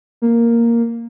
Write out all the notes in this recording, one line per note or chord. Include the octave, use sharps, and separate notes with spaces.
A#3